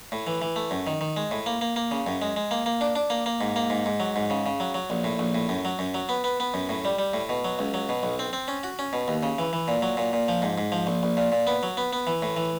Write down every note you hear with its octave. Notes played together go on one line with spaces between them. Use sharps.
A2
E3
E3
A3
F#2
D#3
D#3
G#3
A2
A#3
A#3
A#3
C#3
F#2
G#3
G#3
A#3
A#3
D4
D4
A#3
A#3
G#2
A#3
G#2
G#2
F#3
G#2
C#3
C#3
F#3
F#3
A#1
A2
A#1
A2
F#2
F#3
F#2
F#3
B3
B3
B3
F#2
A2
G3
G3
A2
B2
F#3
C#2
F#3
B2
B1
C4
C4
C#4
F#4
C#4
B2
D#2
C#3
E3
E3
A#2
F#3
A#2
A#2
F3
G#2
G#2
F3
A#1
A#1
A#2
A#2
B3
F#3
B3
B3
E3
A2
E3